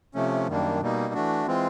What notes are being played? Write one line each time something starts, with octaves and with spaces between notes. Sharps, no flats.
C3 F3 A3 C#4
F#2 D#3 G3 A#3 D4
B2 G3 A#3 D#4
E3 A3 D4 F#4
E3 G#3 C4 F4